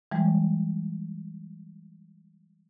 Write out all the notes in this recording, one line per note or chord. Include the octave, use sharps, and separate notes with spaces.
E3 G3 G#3